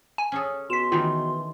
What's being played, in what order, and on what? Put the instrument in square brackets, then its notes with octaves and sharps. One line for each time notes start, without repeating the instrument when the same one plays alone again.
[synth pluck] G#5
[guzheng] C#4 G#4 A4
[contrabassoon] B2 [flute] C6 [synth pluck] B6 E7
[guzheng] D#3 E3 A3 [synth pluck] F4